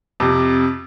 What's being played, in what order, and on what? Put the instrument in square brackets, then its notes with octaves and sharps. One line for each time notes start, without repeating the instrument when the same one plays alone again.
[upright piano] F2 C3